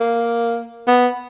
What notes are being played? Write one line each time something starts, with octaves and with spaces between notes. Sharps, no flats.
A#3
B3